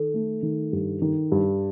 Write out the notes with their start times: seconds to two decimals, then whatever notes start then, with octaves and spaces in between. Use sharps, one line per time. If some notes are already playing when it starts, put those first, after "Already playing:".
Already playing: D#3 A4
0.14 A3
0.43 D#3
0.73 G2
1.02 D#3
1.32 G2